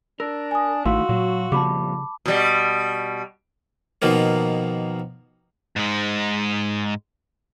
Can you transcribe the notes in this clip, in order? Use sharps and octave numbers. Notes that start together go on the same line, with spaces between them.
D4 A#4 E6
G#5 D#6
A1 D#3 E3 A3 F#4 F5 C6 E6
A#2 F#3
F2 A#2 C#3 G3 A5 B5 D6
B2 G3
B2 D#3 F3 A#3
G#2 G#3